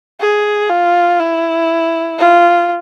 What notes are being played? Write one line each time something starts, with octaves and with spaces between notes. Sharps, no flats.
G#4
F4
E4
F4